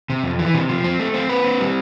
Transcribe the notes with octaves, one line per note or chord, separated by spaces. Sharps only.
C3
F2
E3
C3
F3
C4
A3
C4
B4
C4
G3